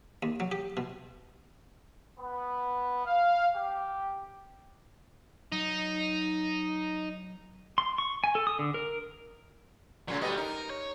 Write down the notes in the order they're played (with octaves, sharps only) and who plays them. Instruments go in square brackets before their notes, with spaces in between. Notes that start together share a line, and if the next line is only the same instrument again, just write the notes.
[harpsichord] D#2
F#3
G4
B2
[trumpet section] B3
F5
G4
[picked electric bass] F#3 [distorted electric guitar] D#4
[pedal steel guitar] C6
C#6
G#5
A4
D#6
D3
A#4
[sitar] A#2 C#3 [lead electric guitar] F#3 A3
[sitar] G3 B3 D#5
[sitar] D#4 [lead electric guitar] A#4
[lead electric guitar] C#5